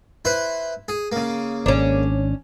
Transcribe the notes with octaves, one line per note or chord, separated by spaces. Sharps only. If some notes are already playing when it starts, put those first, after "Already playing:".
E4 B4 C5
G#4
C#3 A#3
G#1 C#4 D4